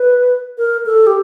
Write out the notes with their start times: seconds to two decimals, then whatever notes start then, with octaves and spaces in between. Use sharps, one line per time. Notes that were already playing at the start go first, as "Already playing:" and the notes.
Already playing: B4
0.58 A#4
0.86 A4
1.07 G4